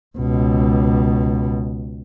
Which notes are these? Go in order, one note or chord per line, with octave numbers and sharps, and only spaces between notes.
C#2 B2